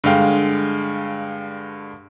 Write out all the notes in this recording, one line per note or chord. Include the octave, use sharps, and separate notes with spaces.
G2 D3 G#3 F5 G5